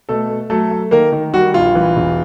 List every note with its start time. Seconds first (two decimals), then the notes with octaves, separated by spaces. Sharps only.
0.09 B2 A3 A4
0.30 A3
0.50 F#3 A3 A4
0.71 A3
0.91 D#3 A#3 A#4
1.12 D#3
1.34 G3 F#4
1.54 A#1 F4
1.75 E3
1.96 E1